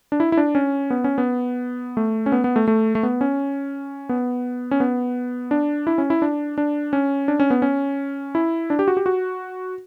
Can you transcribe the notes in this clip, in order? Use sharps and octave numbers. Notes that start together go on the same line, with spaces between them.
D4
E4
E4
D4
C#4
B3
C#4
B3
A3
C#4
B3
B3
A3
A3
A3
B3
C#4
B3
C#4
B3
D4
E4
C#4
E4
D4
D4
C#4
D4
C#4
B3
C#4
E4
D4
G4
F#4
G4
F#4